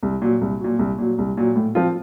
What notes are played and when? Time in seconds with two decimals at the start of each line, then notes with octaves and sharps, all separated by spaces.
0.03 C2
0.22 A#2 F#3
0.41 C2
0.61 A#2 F#3
0.79 C2
0.98 A#2 F#3
1.18 C2
1.37 A#2 F#3
1.56 A2
1.75 F3 C4 F4